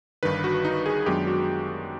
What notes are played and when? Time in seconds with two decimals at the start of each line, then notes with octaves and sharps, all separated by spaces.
0.23 G1 G2 D#3 B4
0.44 F#4
0.65 D#4
0.86 G#4
1.06 F#2 D#3 G#3 B3 D4 G4
1.27 F#4